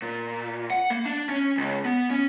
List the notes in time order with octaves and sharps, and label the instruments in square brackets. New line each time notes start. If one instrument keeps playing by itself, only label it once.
[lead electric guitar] A#2
F#5
A#3
D4
C#4
C#2
B3
C#4